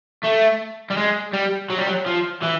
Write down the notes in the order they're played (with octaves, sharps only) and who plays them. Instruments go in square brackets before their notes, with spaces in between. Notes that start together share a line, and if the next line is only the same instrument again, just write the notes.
[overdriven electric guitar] A3
G3
G#3
G3
F#3
G3
F#3
F3
E3